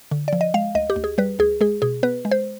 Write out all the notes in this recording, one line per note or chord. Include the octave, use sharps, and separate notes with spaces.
D3
F3 D5
D#5
G#3 F5
D2 D#5
G4
D2
G#4
G3 B4
D2 G#4
G#3 G#4
B2 G#4
B3 B4
G#3
C5